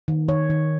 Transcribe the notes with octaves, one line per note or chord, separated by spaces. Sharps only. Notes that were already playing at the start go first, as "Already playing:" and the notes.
D#3
D#3 C#5
D#3